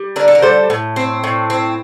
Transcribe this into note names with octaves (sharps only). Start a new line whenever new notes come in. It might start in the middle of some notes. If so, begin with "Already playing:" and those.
Already playing: G3
D3 A#4 D5
A4
A#4
G3 A4 C5
A2
C4
A2
C4